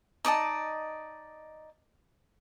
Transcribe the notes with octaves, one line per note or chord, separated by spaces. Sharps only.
D#4 D5 D#5 A5